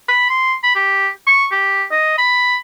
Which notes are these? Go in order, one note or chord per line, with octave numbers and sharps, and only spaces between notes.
B5
C6
B5
G4
C#6
G4
D#5
B5